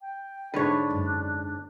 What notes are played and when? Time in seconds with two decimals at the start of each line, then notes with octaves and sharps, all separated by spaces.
0.01 G5
0.54 G#2 D3 D4 B4 C#5
0.90 F#2 G#3